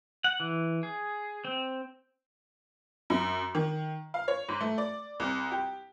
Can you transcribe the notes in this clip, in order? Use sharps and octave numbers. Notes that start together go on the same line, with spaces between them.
F#5
E3
G#4
C4
F#2
D#3
F5
C#5
G#2
A3
D5
C2
G4